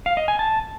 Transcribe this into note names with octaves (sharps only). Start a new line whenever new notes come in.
F5
D#5
G#5
A5